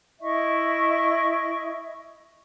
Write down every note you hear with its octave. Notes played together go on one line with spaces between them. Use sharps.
E4 D#5 E5 C#6